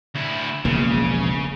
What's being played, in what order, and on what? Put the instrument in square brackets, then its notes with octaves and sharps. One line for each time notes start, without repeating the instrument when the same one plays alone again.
[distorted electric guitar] D2 E4
[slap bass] E1 A#1 A#3 [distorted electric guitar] C#3